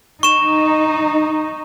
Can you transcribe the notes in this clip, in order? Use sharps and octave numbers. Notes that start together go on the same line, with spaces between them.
D#4 C#6 E7